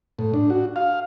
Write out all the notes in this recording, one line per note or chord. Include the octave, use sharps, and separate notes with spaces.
A2
D4
F#4
F5